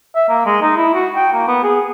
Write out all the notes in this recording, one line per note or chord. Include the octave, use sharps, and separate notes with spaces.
E5
A#3
G#3
D#4
E4
F#4
G5
A#3
B3
G#4